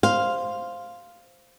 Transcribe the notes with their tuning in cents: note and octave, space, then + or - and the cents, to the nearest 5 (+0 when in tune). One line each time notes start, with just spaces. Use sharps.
C5 +0 F5 +0